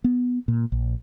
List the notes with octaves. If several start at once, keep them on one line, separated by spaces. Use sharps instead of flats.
B3
A#2
A#1